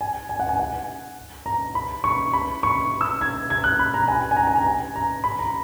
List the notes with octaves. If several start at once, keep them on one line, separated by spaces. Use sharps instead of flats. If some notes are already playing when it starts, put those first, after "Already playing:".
G#5
G#5
F#5
G#5
F#5
A#5
B5
C#6
B5
C#6
E6
G#6
G#6
F#6
B5
A#5
G#5
G#5
A#5
G#5
A#5
G#5
A#5
B5
A#5